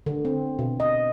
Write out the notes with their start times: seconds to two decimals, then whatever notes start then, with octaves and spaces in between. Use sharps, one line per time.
0.06 D3
0.25 C4
0.59 B2
0.80 D#5